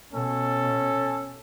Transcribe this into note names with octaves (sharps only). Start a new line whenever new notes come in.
B2 C#4 A4